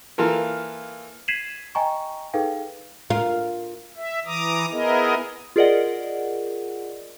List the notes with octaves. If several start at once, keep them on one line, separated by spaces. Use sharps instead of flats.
E3 A#3 F4 A4 A#4
G#6 B6 C7 D#7 E7 F#7
D#5 G5 G#5 A#5 C#6
D#4 G#4 A4 B4 F5 G5
F4 A#4
E5
E3 A#5 D6 D#6
B3 E4 G#4 A#4 D#5
F4 G#4 A#4 D5 D#5 F#5